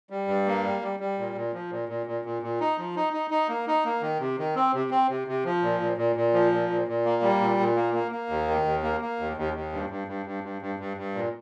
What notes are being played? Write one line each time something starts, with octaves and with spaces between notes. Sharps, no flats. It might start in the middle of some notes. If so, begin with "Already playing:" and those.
G3
G2
A#3
G3
G3
G3
A#2
A#2
F3
A#2
A#2
A#2
A#2
A#2
D#4
F3
D#4
D#4
D#4
A#3
D#4
A#3
D#3
C3
D#3
C4
C3
C4
C3
C3
F3
A#2
A#2
A#2
A#2
F3
A#2
A#2
A#2
A#3
G3
A#2
A#2
A#3
A#3
A#3
D#2
D#3
D#2
A#3
A#3
D#2
D#2
D#2
G2
G2
G2
G2
G2
G2
G2
G2
A#2